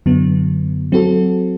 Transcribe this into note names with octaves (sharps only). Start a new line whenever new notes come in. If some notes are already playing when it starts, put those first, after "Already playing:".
F#2 D3 F#3 B3
F#3 C4 F#4 A4